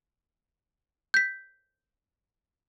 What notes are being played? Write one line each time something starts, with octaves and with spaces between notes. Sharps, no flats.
G6 B6